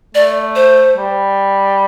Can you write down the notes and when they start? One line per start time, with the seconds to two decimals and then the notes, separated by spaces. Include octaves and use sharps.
0.15 A3 D5
0.55 C5
0.97 G3